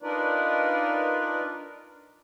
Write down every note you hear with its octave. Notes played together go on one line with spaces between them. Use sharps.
D4 D#4 F4 A#4 B4 D5